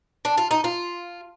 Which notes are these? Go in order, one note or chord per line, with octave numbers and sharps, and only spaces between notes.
D4
F4
D#4
F4